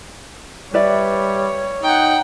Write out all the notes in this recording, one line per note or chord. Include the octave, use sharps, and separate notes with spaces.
G3 B4 C#5 D5 E5
D#4 F#5 G5